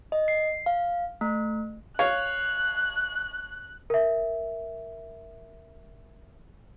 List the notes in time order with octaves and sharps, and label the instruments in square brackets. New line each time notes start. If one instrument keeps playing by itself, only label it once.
[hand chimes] D#5
C7
F5
A3
[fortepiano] C#5 F5 [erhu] F#6
[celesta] A#4 E5